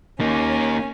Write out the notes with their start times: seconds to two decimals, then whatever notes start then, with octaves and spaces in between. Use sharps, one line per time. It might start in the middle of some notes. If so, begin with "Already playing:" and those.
0.20 A#3 C#4 D#4